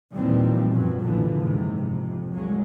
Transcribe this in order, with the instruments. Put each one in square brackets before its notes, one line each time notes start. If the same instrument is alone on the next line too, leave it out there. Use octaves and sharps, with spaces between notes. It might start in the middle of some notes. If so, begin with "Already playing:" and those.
[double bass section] D#2 A#2 E3 F3 G3 C4
F#2 B2 F3 F#3
A#1 F2 A2 D3 E3 F3
F#1 D#2 G#2 C3
F2 C3
C2 G2 F#3 G#3